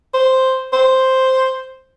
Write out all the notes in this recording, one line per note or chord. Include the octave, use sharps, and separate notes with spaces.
C5
C5